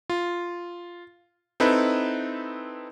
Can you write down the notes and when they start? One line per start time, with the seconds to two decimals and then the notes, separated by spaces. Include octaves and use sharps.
0.10 F4
1.60 C4 D#4 E4 A4 B4